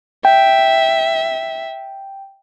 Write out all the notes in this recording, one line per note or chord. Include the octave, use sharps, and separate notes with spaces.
E5 G5